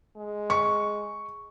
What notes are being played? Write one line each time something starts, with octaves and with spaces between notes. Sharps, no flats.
G#3
C#6